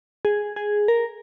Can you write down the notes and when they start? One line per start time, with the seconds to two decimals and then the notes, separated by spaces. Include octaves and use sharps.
0.25 G#4
0.56 G#4
0.88 A#4